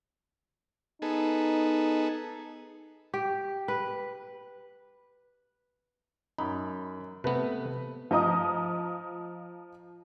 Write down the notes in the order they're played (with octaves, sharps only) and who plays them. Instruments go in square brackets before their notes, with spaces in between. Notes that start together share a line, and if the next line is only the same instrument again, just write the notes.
[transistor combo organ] B3 G#4 A4 [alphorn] D#4
[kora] G4
B4
[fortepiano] F#2 B5 [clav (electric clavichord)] D#4
[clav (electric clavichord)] C3 B3 [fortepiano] A3 B4
[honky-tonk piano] F3 D#5 A#5 D#6